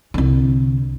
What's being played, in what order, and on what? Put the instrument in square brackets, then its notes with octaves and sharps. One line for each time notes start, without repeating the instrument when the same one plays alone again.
[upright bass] C2 D3